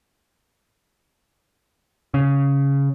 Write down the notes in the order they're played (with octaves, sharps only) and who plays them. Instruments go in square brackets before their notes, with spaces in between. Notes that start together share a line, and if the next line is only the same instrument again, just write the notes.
[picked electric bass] C#3